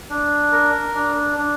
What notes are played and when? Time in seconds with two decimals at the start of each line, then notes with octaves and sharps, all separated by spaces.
0.10 D4
0.52 A#4
0.95 D4
1.38 D4